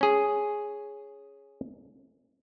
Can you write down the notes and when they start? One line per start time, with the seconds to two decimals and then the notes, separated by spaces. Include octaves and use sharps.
0.01 C#4 G#4